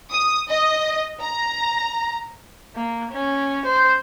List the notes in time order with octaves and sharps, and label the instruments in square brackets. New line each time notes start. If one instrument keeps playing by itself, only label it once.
[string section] D#6
D#5
A#5
[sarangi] A#3
C#4
C5